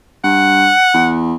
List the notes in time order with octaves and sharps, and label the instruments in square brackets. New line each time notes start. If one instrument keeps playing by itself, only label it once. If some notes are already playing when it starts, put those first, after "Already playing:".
[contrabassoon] G2 [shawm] F#5
[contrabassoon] E2